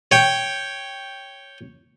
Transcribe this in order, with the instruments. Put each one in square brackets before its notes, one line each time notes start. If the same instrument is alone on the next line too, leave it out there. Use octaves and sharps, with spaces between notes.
[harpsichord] C#5 G5